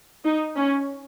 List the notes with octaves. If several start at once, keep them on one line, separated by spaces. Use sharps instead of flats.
D#4
C#4